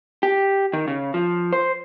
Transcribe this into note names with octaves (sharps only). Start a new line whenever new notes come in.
G4
D#3
C#3
F3
C5